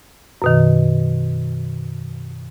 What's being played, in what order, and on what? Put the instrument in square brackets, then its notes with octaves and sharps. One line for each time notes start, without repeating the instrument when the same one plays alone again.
[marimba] F#2 B2 D#3